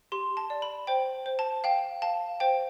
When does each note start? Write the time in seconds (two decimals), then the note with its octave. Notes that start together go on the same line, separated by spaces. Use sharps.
0.12 G4 C6
0.37 A5
0.50 D5
0.62 B5
0.87 C5 G5
1.26 C5
1.39 A5
1.64 F5 G5
2.02 F5 A5
2.40 C5 G5